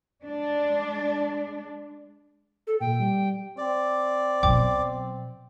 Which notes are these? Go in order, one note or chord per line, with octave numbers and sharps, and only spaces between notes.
G#3 D4
A4
A#2 G5
G3
C4 D5
B2 F#3 G5 D6